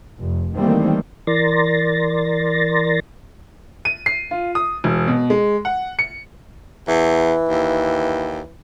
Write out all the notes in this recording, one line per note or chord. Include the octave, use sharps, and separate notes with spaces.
F1
D#3 E3 G3 A3 A#3 C4
E3 A#4 D5 C6 A6 A#6
D#7
C7
F4
D#6
E1
B2
G#3
F#5
C#7
E2 E3
D#2